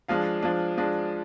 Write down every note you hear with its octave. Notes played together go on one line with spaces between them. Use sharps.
F3 G#3 D4 F5
F3 G#3 D4
F3 G#3 D4